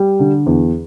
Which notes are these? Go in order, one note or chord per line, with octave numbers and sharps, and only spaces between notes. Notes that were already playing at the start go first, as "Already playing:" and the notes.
Already playing: G3
D3
E2